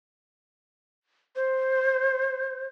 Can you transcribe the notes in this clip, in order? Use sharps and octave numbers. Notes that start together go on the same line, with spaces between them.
C5